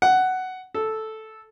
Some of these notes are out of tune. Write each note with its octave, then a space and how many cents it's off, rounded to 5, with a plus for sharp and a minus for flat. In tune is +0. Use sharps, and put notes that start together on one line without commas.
F#5 +10
A4 -5